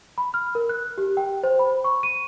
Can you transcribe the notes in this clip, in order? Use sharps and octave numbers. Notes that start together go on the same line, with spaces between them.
B5
F6
A#4
F#6
G4
G5
C5
B5
C#6
D#7